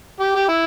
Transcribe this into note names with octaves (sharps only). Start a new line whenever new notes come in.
G4
G4
E4